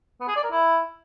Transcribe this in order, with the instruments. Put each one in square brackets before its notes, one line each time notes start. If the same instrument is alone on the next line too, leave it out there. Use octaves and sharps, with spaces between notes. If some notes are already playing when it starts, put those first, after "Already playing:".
[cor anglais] B3
G#4
D5
A#4
E4